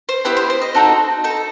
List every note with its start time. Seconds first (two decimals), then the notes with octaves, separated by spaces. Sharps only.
0.09 C5
0.25 B3 E4 G4
0.37 C5
0.50 C5
0.62 D#5
0.75 C4 D#4 F#4 A4
1.24 D#4 A4